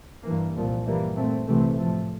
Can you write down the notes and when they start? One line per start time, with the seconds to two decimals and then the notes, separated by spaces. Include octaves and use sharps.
0.23 G2 E3 A#3
0.55 C2 A#2 F3
0.86 G2 E3 G3 A#3
1.16 A#2 A3 C4
1.47 C2 C3 E3 A3 C4
1.78 A2 F3 A3